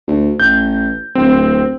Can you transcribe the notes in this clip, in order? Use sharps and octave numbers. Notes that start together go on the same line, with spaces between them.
D2
A1 G6
D1 C4